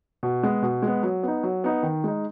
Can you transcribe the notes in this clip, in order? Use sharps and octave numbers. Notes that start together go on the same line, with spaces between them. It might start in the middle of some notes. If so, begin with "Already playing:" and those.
B2
G#3 B3
B2
G#3
B3
F#3
B3 D#4
F#3
B3 D#4
D#3
G#3 D#4